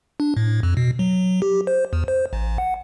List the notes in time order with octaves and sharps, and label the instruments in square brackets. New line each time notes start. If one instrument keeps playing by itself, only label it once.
[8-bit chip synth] D4
A2
F2
B2
F#3
G4
C5
E2
C5
A1
F#5